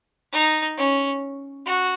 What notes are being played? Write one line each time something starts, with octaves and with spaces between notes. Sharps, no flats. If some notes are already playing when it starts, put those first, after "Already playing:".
D#4
C#4
F#4